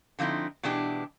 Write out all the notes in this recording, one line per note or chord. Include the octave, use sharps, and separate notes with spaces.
D3 F3 C4 D#4 E4
B2 E3 G#3 D4 G4